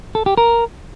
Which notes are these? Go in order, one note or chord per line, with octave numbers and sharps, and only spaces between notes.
A4
G4
A#4